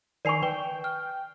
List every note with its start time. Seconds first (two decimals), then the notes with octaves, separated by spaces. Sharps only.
0.25 D#3 A#4 D5 G#5 C#6 C7 F7
0.42 B4 G5 G7
0.84 F6